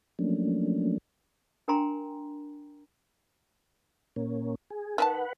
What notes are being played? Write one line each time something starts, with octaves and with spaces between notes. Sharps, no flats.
F3 F#3 A3 A#3 C#4 D4
D4 A#4 G5 G#5 A#5 C6
A#2 A#3 C#4
G#4
D#3 D4 B4 F#5 A5